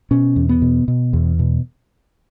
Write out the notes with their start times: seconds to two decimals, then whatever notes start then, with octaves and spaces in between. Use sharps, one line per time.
0.11 B2 C#4
0.36 E2
0.49 B3
0.62 B2
0.88 B2
1.13 E2
1.39 B2